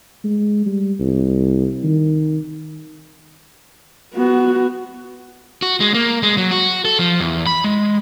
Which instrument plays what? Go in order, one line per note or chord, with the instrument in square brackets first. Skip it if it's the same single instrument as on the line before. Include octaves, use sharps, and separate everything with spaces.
[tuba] G#3
G3
C2
D#3
[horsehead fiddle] B3 F#4
[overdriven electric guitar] F#4
G#3
A#3
G#3
F#3
F#4
A4
F3
E2
B5
G#3